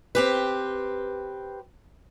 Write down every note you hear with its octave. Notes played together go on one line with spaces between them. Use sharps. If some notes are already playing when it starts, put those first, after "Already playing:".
C4 G4 B4